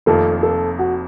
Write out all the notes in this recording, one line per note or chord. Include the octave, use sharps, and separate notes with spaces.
F1 F2 D#3 A#3 F4 A4
A4
F#4